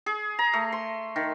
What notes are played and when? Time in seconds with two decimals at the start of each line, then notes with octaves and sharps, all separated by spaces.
0.06 G#4
0.39 A#5
0.53 A3
0.72 C6
1.16 D#3